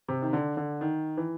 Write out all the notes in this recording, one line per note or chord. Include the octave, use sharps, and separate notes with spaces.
C3
D#3
D3
D3
D#3
E3